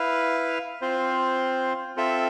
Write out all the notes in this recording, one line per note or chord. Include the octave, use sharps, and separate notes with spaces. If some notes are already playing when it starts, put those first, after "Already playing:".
Already playing: E4 B4 F5
C4 F4 C5
C4 F4 A4 E5